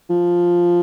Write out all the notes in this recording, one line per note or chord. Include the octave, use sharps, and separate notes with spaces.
F3